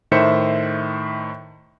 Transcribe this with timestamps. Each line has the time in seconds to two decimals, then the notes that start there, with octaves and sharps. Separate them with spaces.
0.11 A2 D#3 C5 E5 C#7